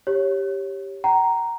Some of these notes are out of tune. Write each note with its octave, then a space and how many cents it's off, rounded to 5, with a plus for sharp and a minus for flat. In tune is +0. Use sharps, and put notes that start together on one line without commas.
G4 +0 C#5 -10
F#5 +45 A#5 +0